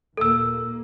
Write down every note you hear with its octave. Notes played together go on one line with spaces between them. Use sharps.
D#2 A#2 A#3 A4 E6